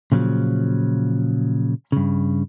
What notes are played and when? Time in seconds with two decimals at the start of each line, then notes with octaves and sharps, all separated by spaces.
0.12 A#2 C#3 F3 F#3
1.92 G2 C#3